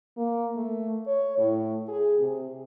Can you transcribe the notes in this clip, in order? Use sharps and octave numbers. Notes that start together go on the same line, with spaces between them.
A#3
A3
C#5
A2
G#4
C3